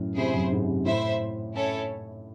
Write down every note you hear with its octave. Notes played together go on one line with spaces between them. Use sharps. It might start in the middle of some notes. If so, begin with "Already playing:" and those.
Already playing: F#2 A2
C3 E4 G#4 C5
F#2
G#2
C3
A2 E4 C5 E5
C#4 E4 A4 C#5